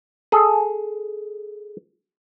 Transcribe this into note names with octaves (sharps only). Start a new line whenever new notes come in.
G#4 A4